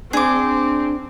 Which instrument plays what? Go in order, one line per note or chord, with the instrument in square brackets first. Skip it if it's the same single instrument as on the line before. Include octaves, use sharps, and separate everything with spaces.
[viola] C4 [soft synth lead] D4 [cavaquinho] G#4 D6